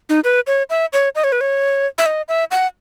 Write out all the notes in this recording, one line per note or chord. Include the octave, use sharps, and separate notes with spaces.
D#4
B4
C#5
E5
C#5
D#5
C#5
B4
C#5
E5
D#5
E5
F#5